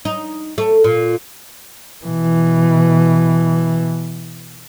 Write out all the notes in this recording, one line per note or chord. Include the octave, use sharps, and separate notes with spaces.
D#4
A3
A#2
B2 E3